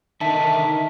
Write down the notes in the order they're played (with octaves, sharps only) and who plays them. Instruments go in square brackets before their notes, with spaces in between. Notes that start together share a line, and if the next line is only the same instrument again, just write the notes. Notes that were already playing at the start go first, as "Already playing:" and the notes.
[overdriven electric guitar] D3 D#4 [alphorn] D#3 [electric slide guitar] E5 [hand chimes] A5